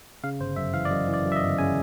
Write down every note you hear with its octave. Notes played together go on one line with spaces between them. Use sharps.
C#3 F5
G1 C5
F#2 E5
E3 F5
D5
F#2 D#5
E3
D5
F#2
E5
D#5
G1
C#3 G#5